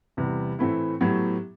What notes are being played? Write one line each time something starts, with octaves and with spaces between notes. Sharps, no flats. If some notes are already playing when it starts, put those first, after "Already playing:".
E2 C3 E3 G3
A2 E3 A3 C4 E4
A2 F#3 B3 E4 G4